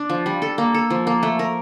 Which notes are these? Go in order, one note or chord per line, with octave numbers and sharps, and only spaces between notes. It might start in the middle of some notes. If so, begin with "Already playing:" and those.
Already playing: D4
F3
G3
A4
A#3
A4
F3
A#3
A3
A#4